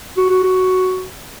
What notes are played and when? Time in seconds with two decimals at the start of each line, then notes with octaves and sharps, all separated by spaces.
0.17 F#4
0.29 F#4
0.43 F#4